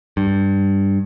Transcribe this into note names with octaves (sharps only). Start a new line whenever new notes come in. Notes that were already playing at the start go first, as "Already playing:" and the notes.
G2